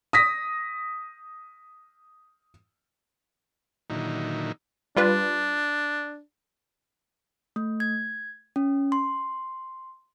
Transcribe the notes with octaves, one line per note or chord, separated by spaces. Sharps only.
D#6 A#6 B6
A#2 D3 D#3 F#3 D#4 E4
G3 D4 F4 B4
A3
G#6
C#4
C6